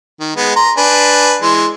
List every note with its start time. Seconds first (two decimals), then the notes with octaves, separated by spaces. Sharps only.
0.20 D#3
0.36 G#3 B3
0.56 A#5 C6
0.77 D4 B4 G#5
1.42 E3 G#3 C6